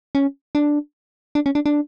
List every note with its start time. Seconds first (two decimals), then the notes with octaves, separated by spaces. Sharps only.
0.15 C#4
0.55 D4
1.35 D4
1.46 C#4
1.55 D4
1.66 D4